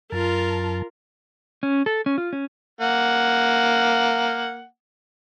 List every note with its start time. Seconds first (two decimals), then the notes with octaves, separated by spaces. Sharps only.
0.12 F#2 F4 A#4 A5
1.63 C#4
1.86 A4
2.06 C#4
2.18 F4
2.33 C#4
2.81 A#3 F#5